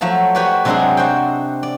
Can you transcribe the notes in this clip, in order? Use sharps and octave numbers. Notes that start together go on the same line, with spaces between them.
F3 F#3 A3 A5
F#4 G4 B4 C#5 D5
C3 F#3 G#3 C4 D4 G#4
F#4 C5 G5
D5